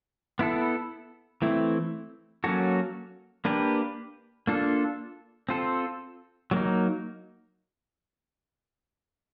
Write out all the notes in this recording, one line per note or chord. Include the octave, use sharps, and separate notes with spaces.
B3 E4 A4
E3 A3 C4 E4
F#3 A#3 C#4 F#4 A4
A#3 D4 G4 B4
A#3 D4 F4 A4
C4 F4 A4 C5
F#3 A#3 D#4